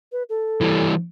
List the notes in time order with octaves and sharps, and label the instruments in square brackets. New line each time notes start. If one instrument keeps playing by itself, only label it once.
[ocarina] B4
A4
[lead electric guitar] E3 G3